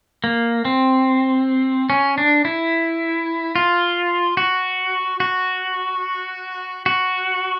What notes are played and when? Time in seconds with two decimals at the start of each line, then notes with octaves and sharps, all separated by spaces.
0.24 A#3
0.65 C4
1.90 C#4
2.18 D4
2.45 E4
3.56 F4
4.37 F#4
5.20 F#4
6.86 F#4